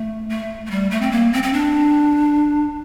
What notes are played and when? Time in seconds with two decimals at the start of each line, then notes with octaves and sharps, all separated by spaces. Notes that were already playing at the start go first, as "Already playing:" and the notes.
Already playing: A3
0.30 A3
0.66 A3
0.71 G3
0.91 A3
1.01 C4
1.11 A#3
1.33 C4
1.43 C4
1.53 D4